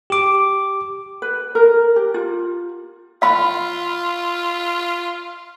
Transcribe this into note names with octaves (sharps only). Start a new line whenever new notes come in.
G4 D6
B4
A#4
G4
F4
F4 F5 B5 C6